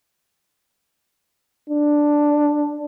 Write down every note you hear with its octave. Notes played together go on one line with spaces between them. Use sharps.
D4